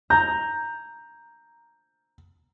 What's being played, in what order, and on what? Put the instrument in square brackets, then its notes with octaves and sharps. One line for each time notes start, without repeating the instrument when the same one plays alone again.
[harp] A#5 [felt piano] G6